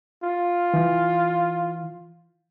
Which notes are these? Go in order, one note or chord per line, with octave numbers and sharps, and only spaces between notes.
F4
E3